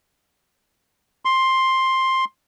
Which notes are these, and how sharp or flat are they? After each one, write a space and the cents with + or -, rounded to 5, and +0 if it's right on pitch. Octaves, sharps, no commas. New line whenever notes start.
C6 +10